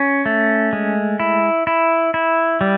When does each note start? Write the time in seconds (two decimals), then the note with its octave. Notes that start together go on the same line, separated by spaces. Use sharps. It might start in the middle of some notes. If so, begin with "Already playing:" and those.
Already playing: C#4
0.26 A3
0.73 G#3
1.20 E4
1.67 E4
2.14 E4
2.61 G3